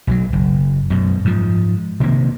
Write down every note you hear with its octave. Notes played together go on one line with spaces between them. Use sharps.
B1 D#3 F#3
F#1
F#2 B2
G#2 F3
C3 D#3 A#3